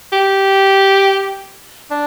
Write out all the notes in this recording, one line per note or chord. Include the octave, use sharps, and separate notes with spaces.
G4
D4